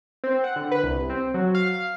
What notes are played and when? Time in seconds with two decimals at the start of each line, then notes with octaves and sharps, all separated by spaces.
0.24 C4
0.44 F#5
0.56 D3
0.71 B4
0.84 C2
1.10 C4
1.34 F#3
1.55 F5